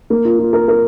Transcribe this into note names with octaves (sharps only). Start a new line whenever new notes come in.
A#3
F4
F4
A#4
A#4